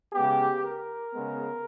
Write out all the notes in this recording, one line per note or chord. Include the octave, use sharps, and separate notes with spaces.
C#3 G#3 B3 G4
A#4
C#3 G#3 B3